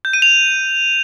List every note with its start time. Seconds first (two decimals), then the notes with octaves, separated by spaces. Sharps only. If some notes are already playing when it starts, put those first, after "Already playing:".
0.05 G6
0.13 D#7
0.22 F7